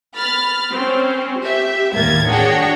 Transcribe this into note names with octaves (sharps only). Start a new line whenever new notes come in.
B5 F6 A6
C4 C#4
G4 E5
D#2 A2 A#3 G#6 A6
D4 F#4 G#4 C#5 F#5 G5